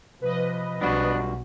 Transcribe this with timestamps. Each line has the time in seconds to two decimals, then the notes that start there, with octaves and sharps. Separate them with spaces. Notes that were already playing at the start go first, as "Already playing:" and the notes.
0.22 C3 F3 B4 D#5
0.81 B1 G2 B3 D4 F#4